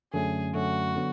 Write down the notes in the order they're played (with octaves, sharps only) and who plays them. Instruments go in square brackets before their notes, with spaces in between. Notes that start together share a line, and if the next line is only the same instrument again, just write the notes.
[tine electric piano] F#2 D3 F#3 A3 C#4 [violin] G#4
[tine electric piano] F#2 D3 F#3 A3 C#4 [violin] F#4
[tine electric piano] D3 F#3 B3